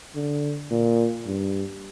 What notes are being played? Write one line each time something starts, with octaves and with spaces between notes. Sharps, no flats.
D3
A#2
G2